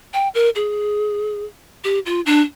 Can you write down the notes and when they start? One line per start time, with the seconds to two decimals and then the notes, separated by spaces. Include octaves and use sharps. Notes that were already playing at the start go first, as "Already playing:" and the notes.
0.14 G5
0.35 A#4
0.55 G#4
1.84 G4
2.06 F4
2.26 D4